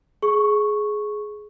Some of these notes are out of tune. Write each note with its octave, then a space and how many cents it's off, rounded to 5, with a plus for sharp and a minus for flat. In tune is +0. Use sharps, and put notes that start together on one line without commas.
G#4 +15 C#6 -5